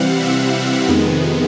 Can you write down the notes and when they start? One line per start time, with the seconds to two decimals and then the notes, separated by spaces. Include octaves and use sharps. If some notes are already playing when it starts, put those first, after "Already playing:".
Already playing: C3 E3 G3 C4 F5 F#5
0.20 E5
0.88 F2 C3 D#3 G#3 B3